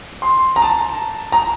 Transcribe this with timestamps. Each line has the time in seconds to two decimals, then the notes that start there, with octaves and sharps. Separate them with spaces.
0.22 C6
0.56 A#5
0.62 A5
1.32 A#5